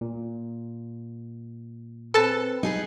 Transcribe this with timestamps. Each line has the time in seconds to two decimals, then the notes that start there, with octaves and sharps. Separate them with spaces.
0.01 A#2
2.14 C4 A4 B4 A5
2.63 D#4 G#4 B4